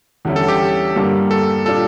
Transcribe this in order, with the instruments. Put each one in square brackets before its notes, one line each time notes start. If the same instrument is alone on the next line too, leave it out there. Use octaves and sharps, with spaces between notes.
[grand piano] E2 D3 G3 C#4 E4
[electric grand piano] A4
G4
[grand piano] G2 D3 G3 A#3
[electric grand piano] A4
[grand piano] A#2 G3 D4 F4 [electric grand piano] A4